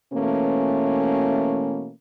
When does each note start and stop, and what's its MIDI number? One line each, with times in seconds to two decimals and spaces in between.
0.13 1.90 47
0.13 1.90 52
0.13 1.90 57
0.13 1.90 58
0.13 1.90 61